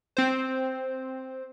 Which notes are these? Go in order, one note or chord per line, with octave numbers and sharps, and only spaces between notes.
C4 C5